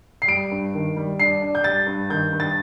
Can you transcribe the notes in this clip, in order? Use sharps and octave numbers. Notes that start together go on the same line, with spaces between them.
C7
G3 D7
G2
D#3
G3
D4 C7
D4
G6
G3 A6
G2
D#3 G6
G2
A6